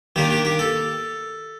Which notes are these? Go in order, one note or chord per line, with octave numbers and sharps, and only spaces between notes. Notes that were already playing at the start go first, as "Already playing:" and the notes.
D#3 A#3 D4 G4
G4
G4
A4